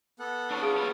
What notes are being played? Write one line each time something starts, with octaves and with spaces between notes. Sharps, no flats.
B3 A4 F#5
D4 C#5
B3 F4 G#4 D#6 D7
G3 C#5